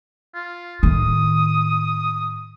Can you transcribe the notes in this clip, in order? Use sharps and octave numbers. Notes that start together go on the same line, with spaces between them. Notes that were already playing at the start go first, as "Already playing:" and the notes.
F4
A2 D#3 D#6